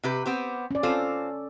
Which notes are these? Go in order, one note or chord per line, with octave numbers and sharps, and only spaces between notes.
C3 G4 B4
B3 C4 G4
C#4 D5
C4 F4 A4 C5